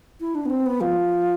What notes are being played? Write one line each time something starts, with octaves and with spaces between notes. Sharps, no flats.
E4
D4
B3
C4
B3
F3